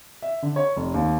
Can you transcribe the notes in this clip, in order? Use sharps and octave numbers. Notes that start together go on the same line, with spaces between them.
E5
D3
C#5
F1
D#2